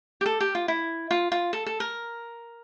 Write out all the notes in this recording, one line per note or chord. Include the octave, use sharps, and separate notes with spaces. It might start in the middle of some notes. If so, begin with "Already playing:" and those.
G4
A4
G4
F4
E4
F4
F4
A4
A4
A#4